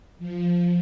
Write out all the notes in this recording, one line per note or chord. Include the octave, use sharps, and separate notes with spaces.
F3